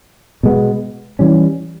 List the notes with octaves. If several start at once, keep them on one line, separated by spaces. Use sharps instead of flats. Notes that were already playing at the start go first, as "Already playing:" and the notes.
B2 G#3 B3
E3 G3 C#4